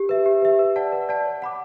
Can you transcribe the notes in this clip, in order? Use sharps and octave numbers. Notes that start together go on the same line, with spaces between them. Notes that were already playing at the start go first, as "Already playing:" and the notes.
Already playing: G4
B4 E5
G4
B4 E5
B4
D5 F#5 A5
B4
D5 F#5 A5
C#5
F#5 B5 D6